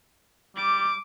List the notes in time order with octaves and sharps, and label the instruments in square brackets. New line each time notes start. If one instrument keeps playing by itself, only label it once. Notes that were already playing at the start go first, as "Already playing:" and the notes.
[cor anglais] G3 [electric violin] D6